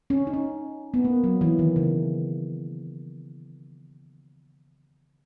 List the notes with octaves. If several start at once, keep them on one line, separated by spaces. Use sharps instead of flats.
C#4
D#4
C#4
B3
A#3
F#3
E3
D#3
C#3